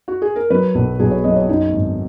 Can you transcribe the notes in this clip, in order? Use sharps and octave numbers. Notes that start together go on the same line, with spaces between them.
F#4
G#4
A#4
F#3 B4
B1
B1 G#4
C#5
F#3 D#5
C#5
F#2 D#4
G#1